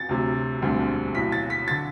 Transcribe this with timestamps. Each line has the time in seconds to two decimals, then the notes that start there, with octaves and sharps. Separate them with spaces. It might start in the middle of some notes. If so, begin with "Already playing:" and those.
Already playing: A6
0.09 D2 C3 F#3
0.61 E1 D2 D3 G3 C4
1.15 B1 A2 F#3 B6
1.32 A6
1.50 B6
1.68 D3 A6